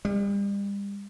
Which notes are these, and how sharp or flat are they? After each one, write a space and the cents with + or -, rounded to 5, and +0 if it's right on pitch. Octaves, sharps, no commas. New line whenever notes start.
G3 +35